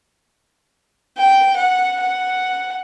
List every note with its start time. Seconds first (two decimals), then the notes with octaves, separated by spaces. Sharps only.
1.18 G5
1.56 F#5
2.01 F#5